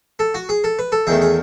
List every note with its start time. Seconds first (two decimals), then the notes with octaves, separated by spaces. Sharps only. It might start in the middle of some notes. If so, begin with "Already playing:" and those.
0.19 A4
0.34 F#4
0.49 G#4
0.64 A4
0.79 B4
0.92 A4
1.07 E2 D#3 A3 G#4
1.22 G#4